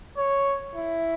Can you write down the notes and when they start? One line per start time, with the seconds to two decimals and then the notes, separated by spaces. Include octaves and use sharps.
0.17 C#5
0.75 E4